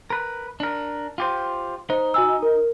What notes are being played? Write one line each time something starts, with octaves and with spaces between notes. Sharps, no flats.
A#4 B4
D4 A#4
F4 G4 C5
D#4 C5
F#4 G#5 E6
A#4